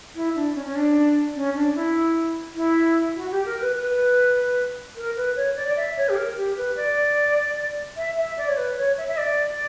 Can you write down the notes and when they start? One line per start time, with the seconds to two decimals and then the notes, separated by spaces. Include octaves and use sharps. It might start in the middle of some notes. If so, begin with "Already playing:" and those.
0.15 E4
0.35 D4
0.55 C#4
0.65 C#4
0.75 D4
1.36 C#4
1.55 D4
1.75 E4
2.55 E4
3.16 F#4
3.31 G4
3.46 A#4
3.61 B4
3.76 B4
4.96 A#4
5.16 B4
5.36 C#5
5.56 D5
5.76 E5
5.97 C#5
6.09 G4
6.16 A#4
6.37 G4
6.57 B4
6.76 D5
7.97 E5
8.17 E5
8.38 D5
8.48 C#5
8.57 B4
8.78 C#5
8.98 E5
9.08 E5
9.18 D5